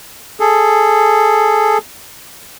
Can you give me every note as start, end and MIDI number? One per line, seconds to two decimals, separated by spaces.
0.40 1.78 68
0.40 1.78 69